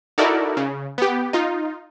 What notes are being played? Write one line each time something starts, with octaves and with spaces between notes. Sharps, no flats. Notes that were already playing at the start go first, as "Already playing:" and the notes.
D#4 E4 F#4 A4 A#4 D5
C#3
B3 G4
D#4 F4